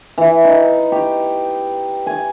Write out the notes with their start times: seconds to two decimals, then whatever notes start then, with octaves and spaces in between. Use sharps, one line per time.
0.18 E3
0.45 D#4
0.92 G4
2.06 G#5